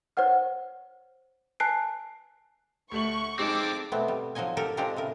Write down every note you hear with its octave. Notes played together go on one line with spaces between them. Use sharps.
C5 C#5 F#5 F6
G#5 A5 F#6 C7 D7
D2 A3 C#6 F#7
G#3 C4 D#4 A4 D6
B2 A3 B3 C4
G3
F3 F#3 D#4 D#5 G#5
G4 A4 A#4
G#3 C4 D4 F4 G4 A#5
A2 C#3 A#4